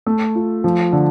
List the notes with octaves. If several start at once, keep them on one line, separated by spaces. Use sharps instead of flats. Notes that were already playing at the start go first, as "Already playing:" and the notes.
A3
F4
F3
D3